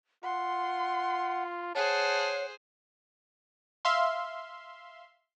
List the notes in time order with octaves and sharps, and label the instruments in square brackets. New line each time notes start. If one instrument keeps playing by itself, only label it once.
[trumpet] F4 [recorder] F#5 [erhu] C6
[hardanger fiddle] G#4 C5 [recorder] C#5 [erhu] F#5 [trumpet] A5
[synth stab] E5 F5 C6